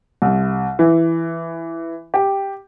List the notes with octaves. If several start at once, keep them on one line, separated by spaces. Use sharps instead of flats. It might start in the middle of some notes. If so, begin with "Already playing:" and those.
C2
E3
G4